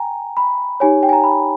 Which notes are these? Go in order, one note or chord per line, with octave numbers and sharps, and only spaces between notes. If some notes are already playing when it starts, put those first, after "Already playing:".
Already playing: G5 G#5 A#5
B5
D#4 G4 C#5 G#5
G5
G#5
A#5
B5